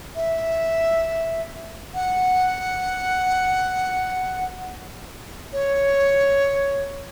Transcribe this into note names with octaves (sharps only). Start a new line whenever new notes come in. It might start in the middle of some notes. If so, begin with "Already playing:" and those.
E5
F#5
C#5